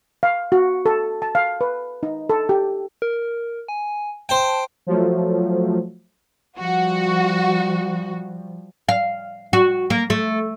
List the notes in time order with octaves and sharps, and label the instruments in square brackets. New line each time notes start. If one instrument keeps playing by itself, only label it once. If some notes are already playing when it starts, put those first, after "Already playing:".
[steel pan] F5
F#4
A4
A5
F5
B4
D#4
A4
G4
[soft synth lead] A#4
G#5
[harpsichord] C5 G5 [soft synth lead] A5
[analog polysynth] F3 F#3 A3
[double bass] F3 G3 [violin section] F#4
[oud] F5
F#4
A#3
A3